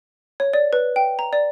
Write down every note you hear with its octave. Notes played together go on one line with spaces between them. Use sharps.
C#5
D5
B4
G5
A#5
D5